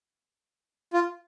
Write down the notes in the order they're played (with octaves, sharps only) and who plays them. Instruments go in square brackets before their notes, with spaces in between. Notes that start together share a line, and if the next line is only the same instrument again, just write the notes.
[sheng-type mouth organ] F4